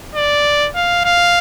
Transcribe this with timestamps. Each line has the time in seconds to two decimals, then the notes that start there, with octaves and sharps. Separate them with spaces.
0.15 D5
0.75 F5
1.05 F5